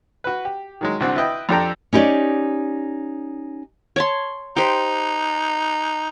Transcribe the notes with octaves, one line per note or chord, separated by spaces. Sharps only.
F#4 B4
G4
D#3 F#3 G#3
C2 D3 C4 F#4
E4 B4 D#5 G5
F2 D4 G4 A4 G5 A#5
C#4 D#4 E4 G4 C#5 D5
C#5 A5 C6
D#4 G4 C5